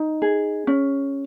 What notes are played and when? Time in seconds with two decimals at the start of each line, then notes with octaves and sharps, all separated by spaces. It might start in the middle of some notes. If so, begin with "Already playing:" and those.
Already playing: D#4
0.22 G#4
0.67 C#4